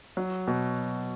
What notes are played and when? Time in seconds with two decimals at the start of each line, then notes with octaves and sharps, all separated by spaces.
0.17 F#3
0.48 B2